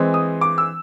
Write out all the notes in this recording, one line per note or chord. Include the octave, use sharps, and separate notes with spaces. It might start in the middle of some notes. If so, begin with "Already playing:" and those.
Already playing: E3 G#3 C4
D#6
D6
E6